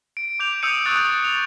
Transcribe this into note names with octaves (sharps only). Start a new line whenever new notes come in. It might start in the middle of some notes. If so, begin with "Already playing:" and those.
D7
D6 G6 F7
D#6 E6 G6 C#7 D#7
C#6 D#6 F#6 A6
F7